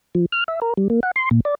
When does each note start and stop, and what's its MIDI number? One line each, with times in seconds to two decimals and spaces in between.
0.15 0.26 53
0.32 0.44 89
0.48 0.60 76
0.62 0.74 70
0.77 0.88 55
0.90 1.00 58
1.03 1.11 78
1.16 1.29 84
1.31 1.40 46
1.45 1.55 74